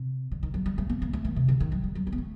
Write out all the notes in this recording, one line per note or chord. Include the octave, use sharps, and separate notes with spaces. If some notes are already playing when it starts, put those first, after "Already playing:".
Already playing: C3
D3
D#3
F#3
G3
A3
A#3
A#3
A3
D#3
C3
D3
D#3
F#3
G3
F#3
G3
A#3
A3